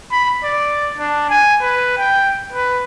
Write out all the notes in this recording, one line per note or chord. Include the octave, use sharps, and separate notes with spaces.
B5
D5
D4
G#5
B4
G5
B4